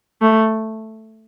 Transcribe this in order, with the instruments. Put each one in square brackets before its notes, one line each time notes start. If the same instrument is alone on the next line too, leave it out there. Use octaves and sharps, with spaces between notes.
[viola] A3